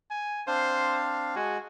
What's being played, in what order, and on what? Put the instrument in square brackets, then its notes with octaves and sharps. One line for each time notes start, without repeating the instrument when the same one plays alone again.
[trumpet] G#5
[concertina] C4 D4 F5 [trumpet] C5
[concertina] G#3 G#5 [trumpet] F#4